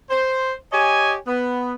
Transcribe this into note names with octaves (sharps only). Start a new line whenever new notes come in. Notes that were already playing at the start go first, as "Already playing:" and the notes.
C5
G4 C#5 D#5 G#5
B3